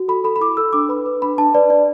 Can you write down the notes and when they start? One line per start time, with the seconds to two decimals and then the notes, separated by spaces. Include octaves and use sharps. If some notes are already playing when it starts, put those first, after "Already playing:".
Already playing: F#4
0.08 A4 B5
0.24 A4 B5
0.36 B5
0.41 E4 D6
0.57 A4 E6
0.73 D4 D6
0.89 B4 B5
1.06 B4
1.22 D4 B5
1.38 D4 A5
1.54 B4 D5
1.70 D4 D5